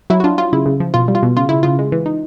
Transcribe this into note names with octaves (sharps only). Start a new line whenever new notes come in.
F#3 E4 F#4
F#4
D4 F4
F#3 F4
C#3 E4
C#3
F3
B2 F4
G3
F4
B2
C#3 F4
C#3 E4
C#3 F4
G#3
E3
D#4